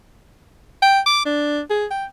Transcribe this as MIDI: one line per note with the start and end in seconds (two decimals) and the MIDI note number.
0.82 1.00 79
1.06 1.23 86
1.25 1.61 62
1.70 1.86 68
1.90 2.05 79